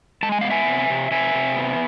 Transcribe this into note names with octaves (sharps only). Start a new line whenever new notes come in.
G#3 A5
G#5
B3 F5
E5 G#5
C3
C3
C3 E5 G#5
C3
B3